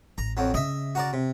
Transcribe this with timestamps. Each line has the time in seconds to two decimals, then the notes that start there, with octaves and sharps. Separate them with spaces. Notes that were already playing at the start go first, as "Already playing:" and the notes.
0.18 A1 A#5
0.37 F2 F#3
0.54 C#3 D#5 E5
0.95 F#4 A#4 D5
1.13 C3